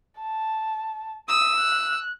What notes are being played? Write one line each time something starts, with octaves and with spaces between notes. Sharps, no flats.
A5
D#6 E6
F#6